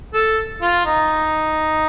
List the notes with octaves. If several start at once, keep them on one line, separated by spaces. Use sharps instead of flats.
A4
F4
D#4